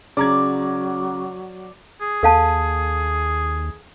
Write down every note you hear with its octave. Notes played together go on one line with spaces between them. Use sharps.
C#3 F#3 D5 A#5 G#6
G#4
D#2 A4 F5 A5